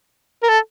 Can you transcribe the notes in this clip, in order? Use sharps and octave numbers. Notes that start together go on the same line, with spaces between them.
A#4
A4